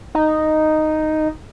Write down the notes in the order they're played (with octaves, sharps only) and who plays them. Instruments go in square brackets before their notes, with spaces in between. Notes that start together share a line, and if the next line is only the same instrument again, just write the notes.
[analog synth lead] D#4